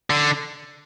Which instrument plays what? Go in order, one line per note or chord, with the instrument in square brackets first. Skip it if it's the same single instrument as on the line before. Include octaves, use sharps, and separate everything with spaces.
[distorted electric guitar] D3